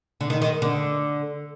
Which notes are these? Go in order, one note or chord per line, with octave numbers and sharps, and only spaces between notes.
D3
D#3
D#3
D3